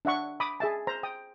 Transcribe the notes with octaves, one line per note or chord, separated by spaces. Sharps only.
D4 E5 F#5 C#6
B5 D6 D#6
G#4 E5 A5
C5 A#5
G5 D#6